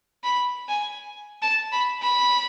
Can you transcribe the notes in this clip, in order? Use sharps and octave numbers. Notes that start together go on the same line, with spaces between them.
B5
G#5
A5
B5
B5